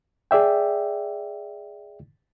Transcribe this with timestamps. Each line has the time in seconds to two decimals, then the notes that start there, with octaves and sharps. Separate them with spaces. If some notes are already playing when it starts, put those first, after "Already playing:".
0.31 G#4 D5 E5 G5